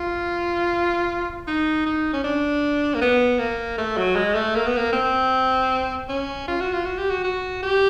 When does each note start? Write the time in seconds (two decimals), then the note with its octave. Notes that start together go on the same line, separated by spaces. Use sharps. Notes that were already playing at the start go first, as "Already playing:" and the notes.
Already playing: F4
1.47 D#4
1.86 D#4
2.13 C#4
2.24 D4
2.95 A#3
3.01 B3
3.39 A#3
3.78 A3
3.97 F#3
4.16 G#3
4.35 A3
4.55 A#3
4.66 B3
4.77 A#3
4.93 C4
6.09 C#4
6.48 F4
6.60 F#4
6.73 F4
6.85 F#4
6.98 G4
7.10 F#4
7.24 F#4
7.63 G4